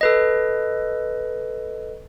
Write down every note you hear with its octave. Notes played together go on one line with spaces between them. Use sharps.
A4 B4 D#5